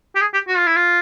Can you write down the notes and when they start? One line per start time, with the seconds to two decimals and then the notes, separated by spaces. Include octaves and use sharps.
0.16 G4
0.21 G#4
0.34 G4
0.48 F#4
0.57 F4
0.67 E4
0.76 F4